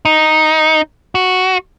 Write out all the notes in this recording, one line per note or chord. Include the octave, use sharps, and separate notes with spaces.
D#4
F#4